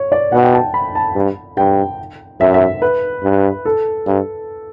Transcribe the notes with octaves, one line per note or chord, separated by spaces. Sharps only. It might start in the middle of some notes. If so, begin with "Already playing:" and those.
Already playing: C#5
D5
B2 F#5
G5
A5
B5
A5
G2
G2 G5
F#2 E5
E5
B4
G2
A4
G2